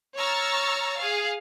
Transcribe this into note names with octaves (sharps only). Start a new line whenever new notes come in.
C#5 A#5 C#6 E6 F6 A6
G#4 F5